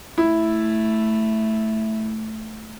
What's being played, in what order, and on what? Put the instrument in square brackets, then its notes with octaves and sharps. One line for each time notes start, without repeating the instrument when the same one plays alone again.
[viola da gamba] A3 [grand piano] E4